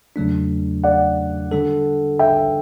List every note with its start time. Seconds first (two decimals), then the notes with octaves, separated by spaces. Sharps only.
0.16 E2 C#3 F#3 A3 D4
0.84 D5 F#5
1.51 D3 G3 D4 A4
2.19 E5 G5